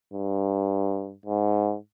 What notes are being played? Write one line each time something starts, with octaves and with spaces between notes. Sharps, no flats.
G2
G#2